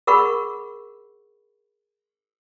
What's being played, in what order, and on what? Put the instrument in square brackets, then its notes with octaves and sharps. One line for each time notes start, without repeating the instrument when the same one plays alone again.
[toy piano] G#4 A#4 F#5 B5 C#6